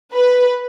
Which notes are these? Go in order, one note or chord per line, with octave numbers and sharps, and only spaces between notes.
B4